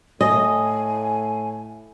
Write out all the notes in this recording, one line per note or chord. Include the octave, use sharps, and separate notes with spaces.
A2 D#5 G#5